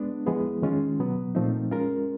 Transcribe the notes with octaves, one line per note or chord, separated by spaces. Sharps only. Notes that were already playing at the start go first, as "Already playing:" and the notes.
Already playing: G#3 B3 D4
F3 G#3 B3 E4 G#4
D#3 G#3 C#4 F4
B2 F#3 B3
A#2 F3 A3 C4 D#4
G#3 C#4 F4 A#4